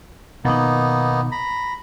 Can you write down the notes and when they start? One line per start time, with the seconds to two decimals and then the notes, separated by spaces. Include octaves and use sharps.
0.45 B2 D#3 A#3 B3 D#4
1.32 A#5 B5